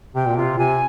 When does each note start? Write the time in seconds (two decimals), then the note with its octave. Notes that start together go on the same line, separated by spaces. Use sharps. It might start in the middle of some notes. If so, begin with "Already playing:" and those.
0.15 C3 G5
0.27 A#2
0.37 C3 F4
0.58 C3 G#5